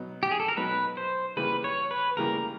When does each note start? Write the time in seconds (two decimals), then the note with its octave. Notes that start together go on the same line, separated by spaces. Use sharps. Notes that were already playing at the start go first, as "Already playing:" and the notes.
Already playing: B2 F#3 B3 D#4
0.23 G4
0.31 G#4
0.40 A4
0.48 A#4
0.57 B2 F#3 B3 D#4 B4
0.97 C5
1.37 C#3 E3 G3 A#3 B4
1.64 C#5
1.91 B4
2.17 C#3 E3 G3 A#3 A#4